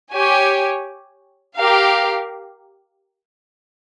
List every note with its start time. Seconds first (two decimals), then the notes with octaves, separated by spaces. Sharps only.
0.14 G4 C#5 G#5
1.57 G4 A#4 F5